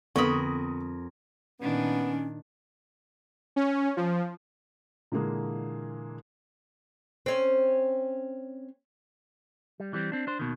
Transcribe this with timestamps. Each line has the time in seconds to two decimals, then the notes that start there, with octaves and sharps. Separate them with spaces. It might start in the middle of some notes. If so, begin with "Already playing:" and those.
0.16 F2 D3 B3 A#4 B5 C#6 D#6
1.60 A#2 D#3 B3 C#4 D4
3.56 C#4
3.97 F3
5.12 A#2 D3 E3 G#3 A#3 G#4
7.26 C4 C#4
9.80 G3
9.93 E3 G3 C4
10.12 C4 D4
10.27 D4 C5
10.39 D#2 B2 D#3